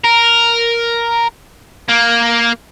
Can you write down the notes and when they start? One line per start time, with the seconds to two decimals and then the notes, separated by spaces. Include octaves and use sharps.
0.04 A#4
1.88 A#3